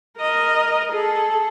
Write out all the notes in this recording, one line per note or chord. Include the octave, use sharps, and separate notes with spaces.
A#4 D#5
G#4 A4